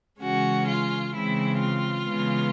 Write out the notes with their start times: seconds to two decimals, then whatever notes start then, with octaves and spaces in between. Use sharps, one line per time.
0.21 C#3 E3 G#3 C#4 F#4
0.67 F4
1.14 C#3 E3 G#3 C4 E4
1.60 F4
2.06 C#3 E3 G#3 B3